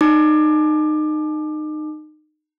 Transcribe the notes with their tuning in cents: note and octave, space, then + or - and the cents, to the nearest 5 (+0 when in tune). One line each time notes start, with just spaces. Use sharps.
D#4 -25 D6 +25